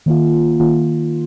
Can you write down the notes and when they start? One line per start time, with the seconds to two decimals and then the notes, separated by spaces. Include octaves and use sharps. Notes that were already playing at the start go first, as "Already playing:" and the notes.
0.06 D#3 A#3 F4
0.60 D#3 A#3 F4